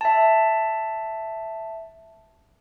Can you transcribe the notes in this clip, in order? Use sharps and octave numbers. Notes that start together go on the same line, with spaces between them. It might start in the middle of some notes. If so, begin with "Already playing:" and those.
E5 A5